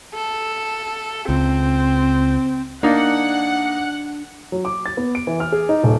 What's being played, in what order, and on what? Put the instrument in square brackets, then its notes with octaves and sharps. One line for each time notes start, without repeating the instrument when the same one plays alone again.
[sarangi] A4
[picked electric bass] C#2 [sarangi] C4
[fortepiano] A#3 D#4 D5 [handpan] D4 [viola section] F#5
[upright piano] F#3
D6
A6
B3
D7
E3
F6
G#4
D#4
D#1